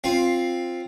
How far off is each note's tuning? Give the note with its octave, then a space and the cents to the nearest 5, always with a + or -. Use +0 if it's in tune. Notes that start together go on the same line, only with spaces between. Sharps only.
C4 +10 F4 +0